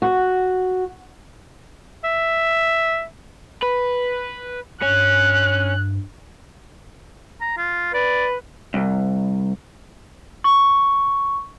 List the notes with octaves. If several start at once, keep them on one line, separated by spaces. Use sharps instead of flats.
F#4
E5
B4
G2 C#4 F#6
A#5
F4
B4 D5
C2
C#6